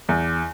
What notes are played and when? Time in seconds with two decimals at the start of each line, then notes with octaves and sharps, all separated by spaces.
0.09 E2